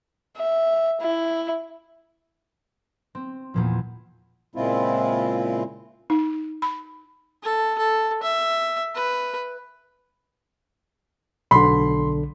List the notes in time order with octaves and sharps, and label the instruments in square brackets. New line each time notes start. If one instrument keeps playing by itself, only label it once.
[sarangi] E5
E4
[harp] C4
E2 A#2 F3
[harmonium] A#2 C#3 G#3 C4 E4 F4
[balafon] D#4
B5
[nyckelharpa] A4
A4
E5
B4
[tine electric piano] B1 D3 [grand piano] B5 C6